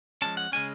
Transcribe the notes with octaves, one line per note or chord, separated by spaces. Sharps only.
F3 G#3 C#4 A5
F#5
C#3 G#3 C#4 G#5